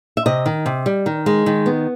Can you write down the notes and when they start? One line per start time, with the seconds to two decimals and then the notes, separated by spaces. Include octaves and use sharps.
0.17 E5
0.26 C3 D#5
0.46 D#3
0.66 C3
0.86 G3
1.06 D#3
1.26 G#3
1.46 D#3
1.66 B3